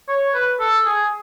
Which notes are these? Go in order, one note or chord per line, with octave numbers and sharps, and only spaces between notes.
C#5
B4
A4
G#4